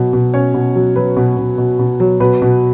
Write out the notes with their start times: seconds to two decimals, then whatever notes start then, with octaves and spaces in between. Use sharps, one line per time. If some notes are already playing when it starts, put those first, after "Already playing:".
Already playing: B2 F#3
0.13 B2
0.34 C#4 C#5
0.54 B2
0.75 F#3
0.96 F#3 B4
1.17 B2
1.37 B2
1.58 B2
1.79 B2
2.00 F#3
2.20 B2 B4
2.42 B2